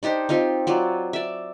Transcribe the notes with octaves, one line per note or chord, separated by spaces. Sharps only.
D4 D#4 G4 C5
C4 D#4 F4 G4
F#3 F4 D5
D5 E5